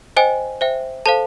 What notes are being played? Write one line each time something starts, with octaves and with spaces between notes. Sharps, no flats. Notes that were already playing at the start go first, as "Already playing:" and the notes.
C5 D#5 G5 G#5
C5 E5 G5
A4 C5 F5 A5